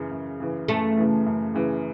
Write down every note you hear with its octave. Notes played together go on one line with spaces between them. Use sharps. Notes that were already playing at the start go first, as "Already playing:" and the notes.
Already playing: F#2 C#3 E3
F#2
C#3 E3
F#2 A3
C#3 E3
F#2
C#3 E3